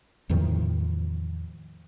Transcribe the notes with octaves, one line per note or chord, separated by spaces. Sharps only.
E2 A2 D#3 F3